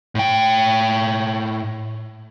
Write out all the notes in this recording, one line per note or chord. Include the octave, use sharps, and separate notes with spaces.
A2 G5